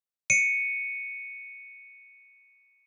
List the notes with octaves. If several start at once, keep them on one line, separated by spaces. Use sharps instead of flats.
C#7 D#7